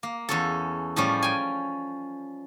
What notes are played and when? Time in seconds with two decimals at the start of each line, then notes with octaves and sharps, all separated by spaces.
0.03 A#3
0.29 E2 C#4 A4
0.96 A2 F3 G3 C#4
1.23 G5 G#5